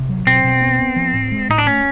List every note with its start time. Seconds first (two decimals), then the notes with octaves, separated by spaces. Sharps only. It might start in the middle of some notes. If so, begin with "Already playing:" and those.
Already playing: C3
0.09 F#3
0.27 B2 C4
0.44 B2
0.62 B3
0.79 B3
0.96 F3
1.14 A2
1.32 G#3
1.49 A2 D#4
1.58 D4
1.66 A3 C#4